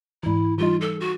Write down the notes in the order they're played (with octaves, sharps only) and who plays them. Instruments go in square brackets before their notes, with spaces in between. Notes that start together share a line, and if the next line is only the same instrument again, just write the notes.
[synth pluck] G#2 E3 [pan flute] E4
[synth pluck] E3 G3 D#4 [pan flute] F4
[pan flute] A4
F#4